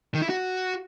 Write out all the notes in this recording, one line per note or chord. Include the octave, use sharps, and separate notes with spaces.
D#3
E4
F#4